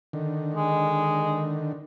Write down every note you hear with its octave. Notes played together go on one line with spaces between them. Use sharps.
D3 D#3
G#3